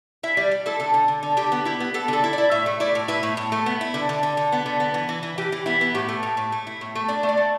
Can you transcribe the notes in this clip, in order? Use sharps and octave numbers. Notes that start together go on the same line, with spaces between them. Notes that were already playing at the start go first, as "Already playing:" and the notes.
E4 E5
G3 D5
G3
E4 A4
D3 A4
D3
D3
D3
D3 G4
B3
E4 G4
B3
B3 A4
D3 A4
E4
D5
E4
A2 E5
A3
E4 D5
A2
E4 B4
A2
A2
A3
B3
E4
D3
D3
D3
D3
B3
D3
B3
E3
E3
E3
E3 G4
E3
B3 E4
B3
A2 G4
A3
A2
A2
A3
E4
A2
A3
D4 D5
A3
D5
A3